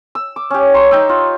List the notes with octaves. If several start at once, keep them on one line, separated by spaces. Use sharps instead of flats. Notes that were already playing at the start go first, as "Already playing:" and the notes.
E6
D6
C#4 G4
C#5 A#5 C6
D#4 G5 E6
F4